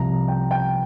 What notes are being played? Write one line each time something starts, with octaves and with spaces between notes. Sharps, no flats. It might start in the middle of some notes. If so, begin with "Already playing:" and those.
Already playing: C2 C3 F3 A#5
G5
G5